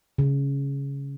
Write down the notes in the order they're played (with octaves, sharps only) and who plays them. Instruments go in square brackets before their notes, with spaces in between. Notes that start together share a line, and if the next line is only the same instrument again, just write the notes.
[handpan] C#3